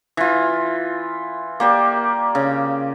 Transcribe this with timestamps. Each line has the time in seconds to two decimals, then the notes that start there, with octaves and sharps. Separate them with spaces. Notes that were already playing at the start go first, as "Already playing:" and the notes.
0.17 E3 F4
1.60 A#3 G4 D5
2.35 C#3